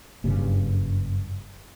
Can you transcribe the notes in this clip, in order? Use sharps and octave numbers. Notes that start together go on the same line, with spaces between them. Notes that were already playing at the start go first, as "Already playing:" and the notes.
F#1 G2 C#3